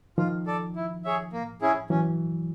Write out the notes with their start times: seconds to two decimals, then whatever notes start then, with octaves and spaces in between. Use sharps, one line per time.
0.18 D#3 F3 F4
0.46 A4 D5
0.76 E4
1.05 G#4 C#5 E5
1.33 A#3
1.61 C#4 E4 G#4
1.90 E3 F#3 C#4